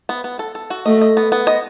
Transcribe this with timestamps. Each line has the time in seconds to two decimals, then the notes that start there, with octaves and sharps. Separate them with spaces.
0.09 B3
0.24 B3
0.39 A4
0.55 A4
0.70 F#4
0.86 A3 D#5
1.01 D#5
1.17 B3
1.32 B3
1.47 D#5